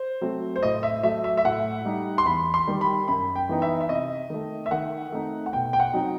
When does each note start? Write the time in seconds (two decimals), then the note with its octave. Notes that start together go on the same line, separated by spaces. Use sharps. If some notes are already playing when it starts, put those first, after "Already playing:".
Already playing: C5
0.21 F#3 A3 C4
0.56 C5
0.63 A2 D#5
0.83 E5
1.03 F#3 A3 E5
1.24 E5
1.37 E5
1.45 A2 F#5
1.85 G3 D#4
2.18 C6
2.25 E2 B5
2.54 C6
2.67 D#3 G3
2.81 B5
3.08 F#2 B5
3.36 G5
3.49 E3 B3 D#4
3.62 E5
3.81 E5
3.89 C3 D#5
4.30 D#3 A3
4.66 E5
4.71 D#3 F#5
5.12 A3 C4 D#4
5.46 F#5
5.53 B2 G5
5.73 G5
5.79 F#5
5.93 F#3 C4 D#4